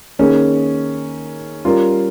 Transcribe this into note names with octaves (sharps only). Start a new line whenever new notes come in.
D#3 A#3 C#4 G#4
G3 C#4 F4 A#4